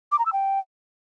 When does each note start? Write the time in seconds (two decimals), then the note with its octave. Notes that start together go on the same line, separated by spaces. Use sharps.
0.12 D6
0.19 A#5
0.26 E6
0.33 G5